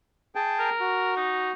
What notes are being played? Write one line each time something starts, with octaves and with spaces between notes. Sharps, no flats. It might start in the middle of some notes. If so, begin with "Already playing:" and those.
G#4 G5 A5
A#4
F#4
D#4